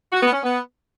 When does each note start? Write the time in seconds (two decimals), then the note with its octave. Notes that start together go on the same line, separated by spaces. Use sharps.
0.12 F#4
0.23 B3
0.33 C#4
0.43 B3